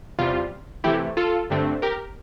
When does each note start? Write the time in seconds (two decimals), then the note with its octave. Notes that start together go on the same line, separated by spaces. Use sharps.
0.18 E2 C3 G3 F4
0.84 C3 E3 A3 E4 G4
1.17 F4 A4
1.50 G2 D3 A3 C4
1.82 G4 A#4